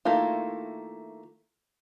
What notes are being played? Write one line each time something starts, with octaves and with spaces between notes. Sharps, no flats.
D#3 A3 A#3 E4 F4